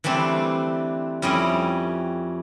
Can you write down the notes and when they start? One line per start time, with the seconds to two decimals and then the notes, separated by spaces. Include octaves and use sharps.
0.04 E3 G3 A3 C4 D4
1.22 F2 G3 C#4 E4 D#5